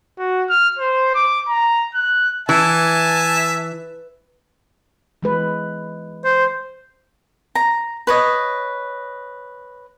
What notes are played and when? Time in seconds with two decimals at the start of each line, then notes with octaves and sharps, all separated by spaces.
0.19 F#4
0.49 F6
0.79 C5
1.15 D6
1.49 A#5
1.95 F#6
2.49 E3 E5 G#5 A5
5.23 E3 G#3 B4
6.24 C5
7.55 A#5
8.07 B4 C#5 D#5